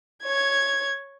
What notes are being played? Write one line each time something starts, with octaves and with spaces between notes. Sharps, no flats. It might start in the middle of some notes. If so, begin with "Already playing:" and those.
C#5 G#6